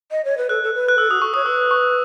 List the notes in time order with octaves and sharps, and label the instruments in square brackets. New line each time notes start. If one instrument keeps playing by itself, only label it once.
[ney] D#5
C#5
B4
[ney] A4 [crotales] F#6
[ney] A4
B4
[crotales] F#6
[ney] A4 [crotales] E6
[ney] F#4 [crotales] D#6
[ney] A4 [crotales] C#6
[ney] C#5 [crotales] D#6
[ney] B4 [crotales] E6
[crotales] C#6